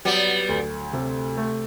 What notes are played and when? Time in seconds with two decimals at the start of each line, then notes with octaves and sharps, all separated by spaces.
0.05 F#3 G3 B3
0.49 D2
0.93 C3
1.37 A3